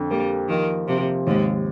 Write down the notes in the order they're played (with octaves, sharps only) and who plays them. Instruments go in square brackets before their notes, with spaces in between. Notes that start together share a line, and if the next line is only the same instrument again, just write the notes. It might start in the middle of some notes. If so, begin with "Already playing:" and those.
Already playing: [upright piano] F2 D3
[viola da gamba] G3 [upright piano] A#3
[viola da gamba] D#3 [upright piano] F3
[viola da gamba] C3 [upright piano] F3
[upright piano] D#2 [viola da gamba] G#2